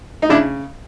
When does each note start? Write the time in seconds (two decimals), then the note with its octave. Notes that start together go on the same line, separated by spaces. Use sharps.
0.22 D#4
0.29 C#3 D4 E4